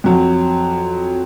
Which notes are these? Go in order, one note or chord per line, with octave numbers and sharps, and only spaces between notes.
F2 F#3